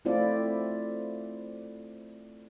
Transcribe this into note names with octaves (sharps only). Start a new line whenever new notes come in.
A3 C4 E4 F4 D5